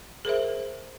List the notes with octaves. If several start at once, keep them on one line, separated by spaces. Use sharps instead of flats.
G#4 A#4 C5 E5